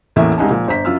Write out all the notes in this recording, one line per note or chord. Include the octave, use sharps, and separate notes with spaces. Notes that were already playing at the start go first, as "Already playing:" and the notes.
A1 E2 A2 A#3 E5
C2 C#3 G#3 D#4 G#5 A5
A#2 F3
G1 C5 A#5 B6
F#2 F4 E6 F6